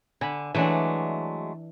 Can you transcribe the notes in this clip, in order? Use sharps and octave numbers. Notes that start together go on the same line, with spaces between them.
D3 G#5 B5
E3 F#3 G#3 A3 D4